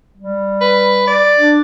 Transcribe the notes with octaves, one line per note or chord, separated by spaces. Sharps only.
G3
B4
D5
D4